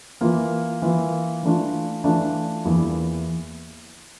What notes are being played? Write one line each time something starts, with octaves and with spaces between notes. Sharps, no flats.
E3 A#3 F4
E3 A#3 F4
E3 A3 D4 F4
E3 A3 D4 F4
E2 E3 A#3 E4